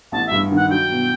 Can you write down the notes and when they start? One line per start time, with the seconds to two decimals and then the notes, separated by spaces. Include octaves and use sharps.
0.12 A1 A5
0.27 G2 E5
0.51 D#3
0.56 F#5
0.70 F#3 G5
0.90 B2